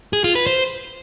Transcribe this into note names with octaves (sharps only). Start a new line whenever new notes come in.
G#4
F4
B4
C5